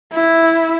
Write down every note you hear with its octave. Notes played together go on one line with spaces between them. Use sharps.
E4